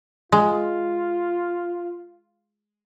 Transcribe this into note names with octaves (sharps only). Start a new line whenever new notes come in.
G#3 F4